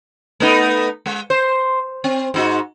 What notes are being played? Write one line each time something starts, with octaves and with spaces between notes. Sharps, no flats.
A3 B3 D#4
G#3
C5
C4
G#2 D#4 F#4